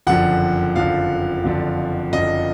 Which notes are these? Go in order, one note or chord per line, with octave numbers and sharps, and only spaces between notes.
F#1 F2 D3 F3 F#5
F#1 F2 D3 F3 F5
F#1 F2 D3 F3
F#1 F2 D3 F3 D#5